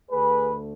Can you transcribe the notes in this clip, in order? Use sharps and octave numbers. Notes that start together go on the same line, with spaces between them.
D2 D3 A3 G#4 B4